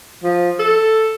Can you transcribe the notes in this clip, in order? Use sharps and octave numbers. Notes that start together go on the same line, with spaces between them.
F3
A4